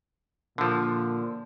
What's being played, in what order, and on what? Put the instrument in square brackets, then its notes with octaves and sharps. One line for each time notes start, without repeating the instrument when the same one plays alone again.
[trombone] A#2 [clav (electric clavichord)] D3 F3